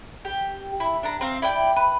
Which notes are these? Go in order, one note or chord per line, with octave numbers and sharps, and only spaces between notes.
G4
E4
D4 A#5
C4 E5 F5 A#5
E4 D5 G5
B4